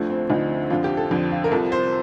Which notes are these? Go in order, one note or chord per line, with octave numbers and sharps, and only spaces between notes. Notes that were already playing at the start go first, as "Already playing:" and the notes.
Already playing: D2 D3 F3 A3
C4
D2 D3 F3 D#4
F2 D3 F3 F4
G4
A4
F2 D3 F3
F4
A#4
C2 C3 F3 A4
C5